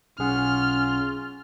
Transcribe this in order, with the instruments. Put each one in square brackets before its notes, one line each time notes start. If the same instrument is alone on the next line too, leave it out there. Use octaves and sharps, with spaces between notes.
[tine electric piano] B1 G#4 F#5 [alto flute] C#4 [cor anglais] F4 [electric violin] F6